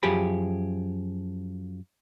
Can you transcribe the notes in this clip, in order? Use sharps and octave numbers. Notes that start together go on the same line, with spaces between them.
F#2 F3 G4 G#4 B5